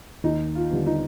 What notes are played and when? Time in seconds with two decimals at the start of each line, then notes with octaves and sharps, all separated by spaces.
0.23 D#2 D#4
0.55 F4
0.71 D3 G3 B3
0.86 D#4